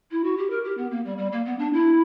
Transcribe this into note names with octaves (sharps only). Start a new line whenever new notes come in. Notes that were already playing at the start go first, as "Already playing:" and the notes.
E4
F#4
G4
A#4
G4
B3
A#3
G3
G3
A#3
B3
D4
E4